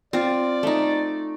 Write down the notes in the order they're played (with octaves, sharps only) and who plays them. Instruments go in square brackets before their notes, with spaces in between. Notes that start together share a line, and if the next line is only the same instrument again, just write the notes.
[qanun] C4 F4 [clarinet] D5
[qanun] A3 D#4